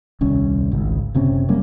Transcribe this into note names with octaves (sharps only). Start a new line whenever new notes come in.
D#1 C2 C#4
G#1 C#2
F#1 C3 C4 C#4
F#3 G3 A#3 C#4